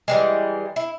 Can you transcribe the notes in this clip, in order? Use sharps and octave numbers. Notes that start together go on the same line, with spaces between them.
E3 G3 G#3
E4